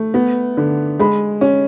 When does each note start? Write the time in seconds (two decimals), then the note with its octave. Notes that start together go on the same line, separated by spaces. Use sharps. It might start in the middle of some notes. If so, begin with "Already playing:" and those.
Already playing: A3
0.14 B3
0.57 D3
0.99 G#3 B5
1.41 C#4